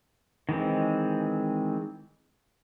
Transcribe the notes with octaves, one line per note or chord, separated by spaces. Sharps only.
D#3 E3 G#3 C4